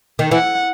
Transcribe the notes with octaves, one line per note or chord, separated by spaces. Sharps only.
D#3
E3 F#5